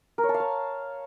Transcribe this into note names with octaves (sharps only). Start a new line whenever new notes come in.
A#4
C#5
A5
F5
C#5